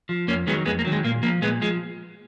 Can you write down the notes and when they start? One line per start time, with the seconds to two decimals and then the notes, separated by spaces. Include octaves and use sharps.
0.09 F3
0.28 F2 A#3 C#4
0.47 D#3 F#3 G#3 B3
0.66 F2 G#3 B3
0.79 A#3
0.85 D#3 F#3
0.92 G#3
1.04 A#2 A#3
1.23 F3 A#3
1.42 A#2 G#3 B3
1.62 F3 G#3